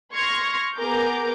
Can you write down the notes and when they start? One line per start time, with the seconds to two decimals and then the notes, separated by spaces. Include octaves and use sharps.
0.13 C6 C#6 F6 G#6 A#6
0.77 B3 G#4 A#4 A#5 D6 G6